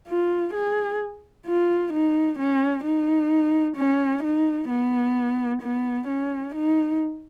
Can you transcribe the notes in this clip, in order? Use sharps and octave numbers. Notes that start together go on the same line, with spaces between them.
F4
G#4
F4
D#4
C#4
D#4
C#4
D#4
B3
B3
C#4
D#4